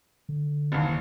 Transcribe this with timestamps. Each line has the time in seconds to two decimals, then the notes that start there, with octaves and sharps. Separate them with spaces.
0.29 D3
0.72 F#1 D#2